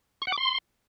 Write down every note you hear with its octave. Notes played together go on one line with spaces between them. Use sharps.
C#6
F#5
D6
C6